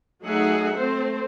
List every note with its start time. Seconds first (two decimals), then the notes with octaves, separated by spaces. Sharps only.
0.24 F#3 A3 D#4 G#4 E5 F#5
0.77 A3 C4 C5